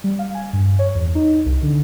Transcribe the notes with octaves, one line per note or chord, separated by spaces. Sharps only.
G3
F5
G#5
G2
C#5
E2
D#4
C2
D3